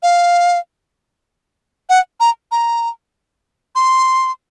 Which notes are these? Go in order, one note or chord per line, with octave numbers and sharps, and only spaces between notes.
F5
F#5
A#5
A#5
C6